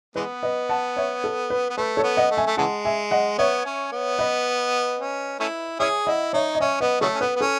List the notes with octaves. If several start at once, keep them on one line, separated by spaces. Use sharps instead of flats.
E3 G#3 B3 B4
B4 D#5
F#5 A5
C#5 E5
A4
B4
B3
A3 B4
A4 C#5
B3
D#5 F#5
A3
E5 G#5
A3
C#3 E3 G#3 F#5 A5
E5 G#5
D#5 F#5
B3 C#5 E5
C#4
B3
B4 D#5
C#4
A3 C#4 E4
C#4 E4 G#4 C#5 E5
E4 D#5 F#5
D#4 C#5 E5
D#5
C#4 C#5 E5
B3 B4 D#5
C#3 F#3 A3 A4 C#5
C#4
B3 B4
B3
C#4 A4